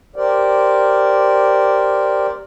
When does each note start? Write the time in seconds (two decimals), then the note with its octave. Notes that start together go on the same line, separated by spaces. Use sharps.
0.16 G4 A#4 C5 D5